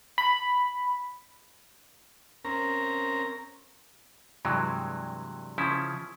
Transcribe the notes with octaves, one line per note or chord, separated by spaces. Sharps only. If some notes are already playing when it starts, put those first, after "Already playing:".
B5
C4 C#4 A#4 A#5
G2 C3 E3 F#3 G#3
C#3 F3 C#4 E4